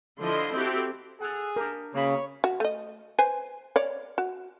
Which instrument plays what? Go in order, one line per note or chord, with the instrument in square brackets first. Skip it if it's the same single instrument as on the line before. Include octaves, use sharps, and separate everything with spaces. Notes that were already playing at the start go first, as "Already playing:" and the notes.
[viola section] D3 F3 E4 D#5 C6
C4 E4 F#4 G4 A4
[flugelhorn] G#4 [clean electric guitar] A4 F#5
[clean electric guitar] D4 G4 [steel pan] A#4
[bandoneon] C#3 [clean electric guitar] A#3 F#4 B5 [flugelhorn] C#5
[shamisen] F#4
A3 D#5
B4 C5 G#5
C#5 D5
F#4